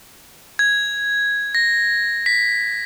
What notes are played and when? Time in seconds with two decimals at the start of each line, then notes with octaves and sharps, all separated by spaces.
0.59 G#6
1.55 A#6
2.26 B6